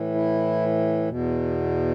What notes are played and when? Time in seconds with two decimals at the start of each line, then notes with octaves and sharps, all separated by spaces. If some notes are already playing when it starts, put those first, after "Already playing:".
Already playing: A2 E3
0.15 E4
1.08 E2 B2